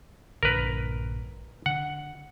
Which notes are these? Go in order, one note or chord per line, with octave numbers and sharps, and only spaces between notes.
A#1 G2 D3 A#4 B4
D3 F#5